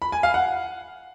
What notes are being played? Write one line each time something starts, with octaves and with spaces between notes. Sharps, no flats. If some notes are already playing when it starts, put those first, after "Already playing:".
B5
G#5
F5
F#5